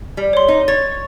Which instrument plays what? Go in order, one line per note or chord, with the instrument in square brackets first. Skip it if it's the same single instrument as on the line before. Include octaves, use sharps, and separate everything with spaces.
[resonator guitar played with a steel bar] G3
[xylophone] C#5 C6
[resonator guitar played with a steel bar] D#4
[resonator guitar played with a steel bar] C#5 [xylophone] A6